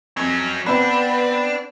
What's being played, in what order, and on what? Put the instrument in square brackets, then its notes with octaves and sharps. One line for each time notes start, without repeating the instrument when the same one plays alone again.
[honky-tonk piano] F2 [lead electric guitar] F#3 C#4
[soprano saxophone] B3 [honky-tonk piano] C4 B4 [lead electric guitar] D4